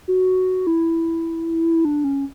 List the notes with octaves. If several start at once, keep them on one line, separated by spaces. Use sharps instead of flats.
F#4
E4
D4
C#4